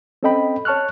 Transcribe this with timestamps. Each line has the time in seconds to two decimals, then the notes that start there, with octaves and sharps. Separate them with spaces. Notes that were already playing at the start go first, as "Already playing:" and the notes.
0.23 C4 C#4 A4 D#5 G5 B5
0.65 C#5 A5 C#6 F6 F#6